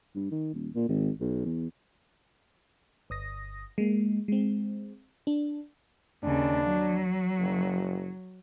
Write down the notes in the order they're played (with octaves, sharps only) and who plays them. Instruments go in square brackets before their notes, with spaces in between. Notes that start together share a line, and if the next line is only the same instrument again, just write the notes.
[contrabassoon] G2
D#3
D#1
A#2
G#1
B1
E2
[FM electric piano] G1 D#6 A#6
G#3 A#3
G#3 C4
D4
[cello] D#2 C#3 [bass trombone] D4
[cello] F#3
[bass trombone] F#1